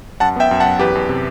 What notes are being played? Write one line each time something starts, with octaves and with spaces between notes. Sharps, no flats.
F#2 F#5 A5
B3 E5 G5
F#2
F#5 A5
F#2
E2 G4 B4
E2
C3